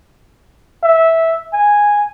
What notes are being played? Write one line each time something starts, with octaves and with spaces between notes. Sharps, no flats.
E5
G#5